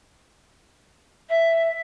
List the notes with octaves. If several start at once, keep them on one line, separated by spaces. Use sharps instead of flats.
E5